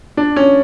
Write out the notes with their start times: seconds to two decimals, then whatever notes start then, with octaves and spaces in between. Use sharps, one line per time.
0.17 D4
0.36 C#4